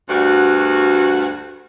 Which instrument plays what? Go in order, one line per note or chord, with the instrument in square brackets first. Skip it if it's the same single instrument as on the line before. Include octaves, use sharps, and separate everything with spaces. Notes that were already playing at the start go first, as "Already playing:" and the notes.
[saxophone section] D2 G2 F#4